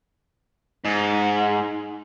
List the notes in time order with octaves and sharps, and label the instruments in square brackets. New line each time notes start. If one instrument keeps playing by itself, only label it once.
[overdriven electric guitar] G#2